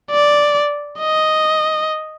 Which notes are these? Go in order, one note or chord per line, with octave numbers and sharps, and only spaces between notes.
D5
D#5